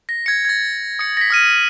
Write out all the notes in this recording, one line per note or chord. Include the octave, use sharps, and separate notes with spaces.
A#6
G#6 C#7
G#6 A6
D#6 C#7
A#6 B6
D#6 F6 D#7